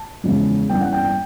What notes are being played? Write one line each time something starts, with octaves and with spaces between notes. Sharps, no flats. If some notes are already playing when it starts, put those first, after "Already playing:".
Already playing: A5
E2 C#3 F3 G#3
G2 E3 G3 A#3 C#4 G5
F#5
G5
G5